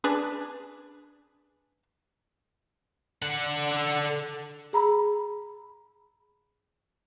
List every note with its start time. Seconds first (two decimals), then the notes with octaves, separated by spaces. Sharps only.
0.04 D4 G#4 B4
3.22 D3 F#5
4.73 G#4 A#5 B5